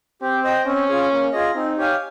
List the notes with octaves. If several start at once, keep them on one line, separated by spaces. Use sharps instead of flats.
C4 G4
C5 D#5 G5
C4 C#4
F4 G#4
A#3
F4 G#4 D#5
C4 D#4
G4 C#5 F5 G#5